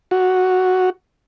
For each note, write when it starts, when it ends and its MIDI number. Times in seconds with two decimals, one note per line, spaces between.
0.11 0.90 66